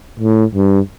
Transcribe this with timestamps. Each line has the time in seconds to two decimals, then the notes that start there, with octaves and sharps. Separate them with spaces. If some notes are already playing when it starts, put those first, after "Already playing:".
0.20 A2
0.55 G2